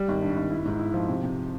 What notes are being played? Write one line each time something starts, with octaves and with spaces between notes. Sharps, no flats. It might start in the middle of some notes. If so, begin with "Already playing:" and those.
Already playing: G3
G#1
G2
G#1
E4
G#2
E4
F3
C3
C3